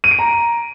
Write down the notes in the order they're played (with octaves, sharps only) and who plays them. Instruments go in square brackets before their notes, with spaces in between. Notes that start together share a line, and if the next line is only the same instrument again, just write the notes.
[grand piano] D#7
D7
A#5